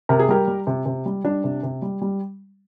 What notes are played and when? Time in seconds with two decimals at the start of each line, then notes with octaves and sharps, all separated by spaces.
0.09 C3 A#4
0.19 G#4
0.29 G3 G4 A#4
0.48 G3
0.67 C3
0.86 C3
1.06 G3
1.24 G3 D4
1.44 C3
1.63 C3
1.82 G3
2.02 G3